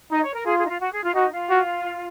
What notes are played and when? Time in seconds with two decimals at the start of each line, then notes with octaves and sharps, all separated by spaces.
0.11 D#4 D#5
0.23 C#5
0.34 A#4
0.46 F4 G#4
0.58 G#4
0.65 D#4
0.69 F4
0.80 F#4
0.92 G#4
1.04 F4
1.14 D#4 F#4
1.32 F4
1.50 F#4